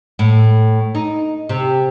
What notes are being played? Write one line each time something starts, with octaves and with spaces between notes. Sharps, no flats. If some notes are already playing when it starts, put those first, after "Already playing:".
A2
D#4
C3